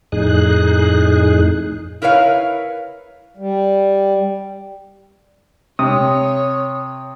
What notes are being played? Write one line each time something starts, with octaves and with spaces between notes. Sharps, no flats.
F2 A2 D#4 G#4 F#6
E4 A#4 B4 C#5 F5
G3
C3 C#5 D#6